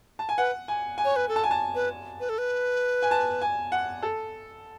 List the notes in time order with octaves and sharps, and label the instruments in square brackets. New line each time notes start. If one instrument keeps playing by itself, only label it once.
[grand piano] A5
G#5
[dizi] B4 [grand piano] F#5
[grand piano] G#5
G#5
[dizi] C#5
B4
A4
[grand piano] A5
G#5
A5
[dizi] B4
B4
A4
B4
[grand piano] G#5
A5
G#5
F#5
A4